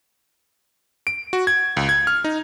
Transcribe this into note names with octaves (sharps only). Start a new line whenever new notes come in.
D7
F#4
G#6
C#2
G#6
F6
D#4